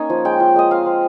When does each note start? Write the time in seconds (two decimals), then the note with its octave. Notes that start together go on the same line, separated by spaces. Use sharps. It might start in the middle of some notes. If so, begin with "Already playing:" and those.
Already playing: A#3 C#4 D#4 G#5
0.10 F3
0.25 G#3 G5
0.40 F4
0.56 G#3 D#5
0.71 C4 F5
0.86 C4